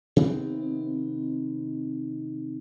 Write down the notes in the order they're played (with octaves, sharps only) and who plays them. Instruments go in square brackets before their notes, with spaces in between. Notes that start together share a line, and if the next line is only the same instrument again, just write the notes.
[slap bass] C3 D#3 B3 C4